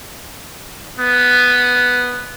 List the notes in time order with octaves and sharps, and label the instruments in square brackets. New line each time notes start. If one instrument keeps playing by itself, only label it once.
[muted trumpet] B3